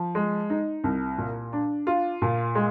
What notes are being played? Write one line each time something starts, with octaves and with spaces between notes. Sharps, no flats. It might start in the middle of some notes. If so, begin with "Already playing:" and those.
Already playing: F3
G#3
D#4
C2
A#2
D4
F4
A#2
G#3